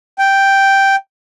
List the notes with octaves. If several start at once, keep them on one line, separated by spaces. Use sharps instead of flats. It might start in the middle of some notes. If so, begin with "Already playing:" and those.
G5